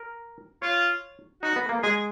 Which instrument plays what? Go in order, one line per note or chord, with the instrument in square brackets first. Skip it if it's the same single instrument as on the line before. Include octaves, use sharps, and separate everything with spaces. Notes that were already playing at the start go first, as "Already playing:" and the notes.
Already playing: [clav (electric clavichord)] A#4
[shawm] F4 [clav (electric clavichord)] C#5
[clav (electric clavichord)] D#4 [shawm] F#4
[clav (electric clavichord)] B3
A#3
[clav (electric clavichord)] G#3 [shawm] G#4